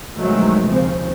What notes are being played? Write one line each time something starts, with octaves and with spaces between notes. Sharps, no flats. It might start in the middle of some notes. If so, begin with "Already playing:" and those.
A#1 B2 D#3 F#3 G#3 A3
D#2 C#3 F3 C4